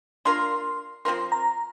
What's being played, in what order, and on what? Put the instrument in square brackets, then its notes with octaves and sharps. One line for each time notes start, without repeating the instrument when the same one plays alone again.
[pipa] A#3 D4 F4 A#4 [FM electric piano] C6
[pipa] F3 C4 F4 A#4 [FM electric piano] C6
[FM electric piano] A#5